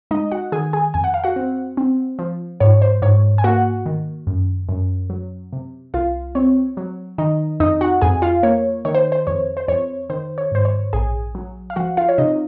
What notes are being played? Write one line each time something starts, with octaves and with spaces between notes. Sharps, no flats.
G#3 D#4 D#5
F#4 F#5
D#3 G#4 G#5
G#4 G#5
F2 G#5
F#5
F5
F#4 F#5
C4
C4
F3
G#2 C#5
C5
G#2 C#5
G#5
A#3 F#4 F#5
D#3
F#2
F#2
F#3
C3
C2 F4 F5
C4 C#5
F#3
D#3 D#4 D#5
F2 D#4 D#5
F#4 F#5
F2 G#4 G#5
F4 F5
A#3 C#5
D#3 C#5
C5
C5
F2 C#5
C5
F2 C#5
D#3 C5
C#5
G#2 C5
C#5
A#1 G#4 G#5
F#3
F5
F3 F#4 F#5
F4 F5
C#5
C3 D#4 D#5